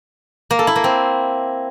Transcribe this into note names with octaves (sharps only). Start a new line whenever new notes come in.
A#3
A4
E4
A#3
C4